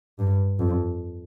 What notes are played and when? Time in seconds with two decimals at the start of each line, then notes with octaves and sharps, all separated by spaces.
0.19 G2
0.59 F2